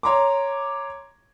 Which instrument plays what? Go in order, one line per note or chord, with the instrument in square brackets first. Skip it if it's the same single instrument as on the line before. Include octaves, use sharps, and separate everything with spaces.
[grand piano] C#5 A#5 C6 D6